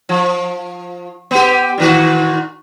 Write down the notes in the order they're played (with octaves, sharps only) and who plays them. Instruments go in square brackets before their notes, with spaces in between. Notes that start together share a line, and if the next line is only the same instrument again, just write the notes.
[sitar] F3
B3 G4
A#2 D#3 F#4